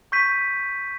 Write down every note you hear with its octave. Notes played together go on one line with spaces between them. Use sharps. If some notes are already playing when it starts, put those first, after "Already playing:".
C#6 G6 B6 D#7